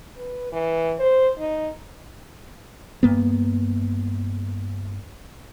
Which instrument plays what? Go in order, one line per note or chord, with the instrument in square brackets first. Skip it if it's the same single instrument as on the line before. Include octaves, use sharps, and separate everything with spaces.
[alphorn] B4
E3
C5
D#4
[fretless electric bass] G2 A#3 B3